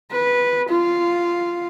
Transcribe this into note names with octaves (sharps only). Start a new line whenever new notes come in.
B4
F4 F5